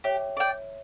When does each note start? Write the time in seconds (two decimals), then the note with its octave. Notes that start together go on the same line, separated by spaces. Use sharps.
0.04 G4 C#5 E5
0.37 D5 G5